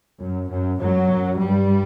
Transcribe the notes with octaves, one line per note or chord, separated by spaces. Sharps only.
F#2
F#2
F#2 F#3
F#2
G2 G3